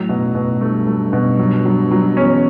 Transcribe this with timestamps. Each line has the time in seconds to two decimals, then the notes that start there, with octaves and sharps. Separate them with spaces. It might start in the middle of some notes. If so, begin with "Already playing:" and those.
Already playing: A2 F#3
0.09 B2
0.35 B2
0.61 G2 A3
0.87 A3
1.13 B2
1.39 F#3
1.65 F#3
1.91 F#3
2.17 E2 C#4